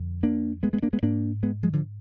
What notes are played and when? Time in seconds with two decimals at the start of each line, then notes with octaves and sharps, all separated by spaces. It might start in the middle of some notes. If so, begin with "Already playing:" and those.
Already playing: F2 D3
0.23 A#3 D4
0.63 G#3 B3
0.73 G#3 B3
0.83 A#3 D4
0.93 G#3 B3
1.02 G#2 A#3 D4
1.43 G#3 B3
1.63 F3 G#3
1.73 D3 F3